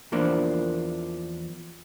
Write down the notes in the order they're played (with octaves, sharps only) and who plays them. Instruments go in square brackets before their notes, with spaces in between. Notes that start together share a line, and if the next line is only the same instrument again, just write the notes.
[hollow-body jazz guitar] E2 E3 F3 A#3 D4